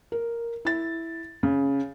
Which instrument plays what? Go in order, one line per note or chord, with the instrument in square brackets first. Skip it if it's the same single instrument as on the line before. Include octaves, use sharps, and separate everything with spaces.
[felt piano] A#4
E4 A6
C#3